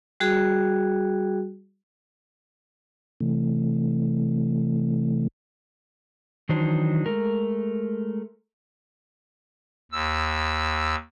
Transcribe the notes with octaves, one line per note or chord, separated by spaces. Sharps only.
G3 F#4 G#4
C3 E3 A3
D#3 E3 F#3 D4 D#4 C5
G#3 A3 A#4
D#2 E6